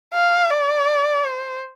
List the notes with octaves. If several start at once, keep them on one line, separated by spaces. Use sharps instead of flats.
F5
D5
C5